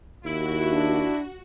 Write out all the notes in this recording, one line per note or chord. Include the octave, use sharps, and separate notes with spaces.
D#2 E4 F#4
D4